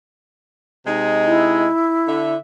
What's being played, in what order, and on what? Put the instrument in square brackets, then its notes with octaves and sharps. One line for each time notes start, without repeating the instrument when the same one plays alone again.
[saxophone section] C3 G#3 D#4
[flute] E4
[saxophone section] D3 E5